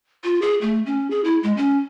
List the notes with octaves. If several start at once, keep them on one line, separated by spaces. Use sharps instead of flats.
F4
G#4
A3
C#4
G#4
E4
G#3
C#4